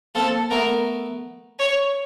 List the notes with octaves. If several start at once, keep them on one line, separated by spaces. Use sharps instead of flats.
A#3 C4 A4
A3 B3 A#4
C#5